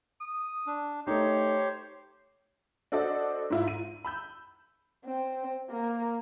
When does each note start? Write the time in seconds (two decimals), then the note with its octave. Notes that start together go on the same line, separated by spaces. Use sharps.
0.21 D#6
0.67 D4
1.07 A3 D#4 G4 C5 C#5
2.92 D4 F#4 A4 C5 D5 D#5
3.50 G#2 E4 F4
3.68 D#7
4.05 B5 E6 G6
5.06 C4
5.70 A#3